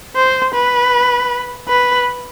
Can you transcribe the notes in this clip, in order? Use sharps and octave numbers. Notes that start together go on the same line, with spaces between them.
C5
B4
B4